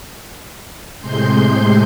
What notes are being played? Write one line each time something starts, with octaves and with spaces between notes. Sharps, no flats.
A2 C3 G#3 C6 G6